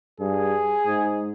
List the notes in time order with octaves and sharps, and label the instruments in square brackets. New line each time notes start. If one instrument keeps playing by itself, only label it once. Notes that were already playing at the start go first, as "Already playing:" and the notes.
[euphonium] G2 [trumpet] G#4
[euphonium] G#2